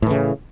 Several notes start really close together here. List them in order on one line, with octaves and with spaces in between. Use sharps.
A2 E3 C#3